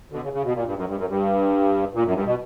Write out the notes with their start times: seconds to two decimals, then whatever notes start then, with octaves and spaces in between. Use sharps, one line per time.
0.11 B2 D3
0.23 C#3
0.33 C#3
0.44 B2
0.54 A#2
0.65 G2
0.76 F#2
0.87 G2
0.96 F#2
1.08 G2
1.94 A#2
2.04 F#2
2.14 G2
2.25 B2